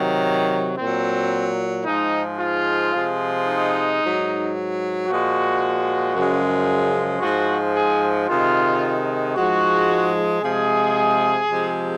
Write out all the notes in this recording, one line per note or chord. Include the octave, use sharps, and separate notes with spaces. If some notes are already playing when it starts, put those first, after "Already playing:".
Already playing: C3 D#3 F#3
A#2 F#3 C4
G#2 F3 G#3 D#4
F4
C3 F3 G#3
D#4
G#2 F#3
A#2 F3 G#3 F#4
F#2 C#3 F3 G#3
G#2 F3 G#3 F#4
G#4
C3 D#3 G#3 F4
G#2 F3 G#3 F#4
C3 F3 G#3 G#4
C3 F3 G#3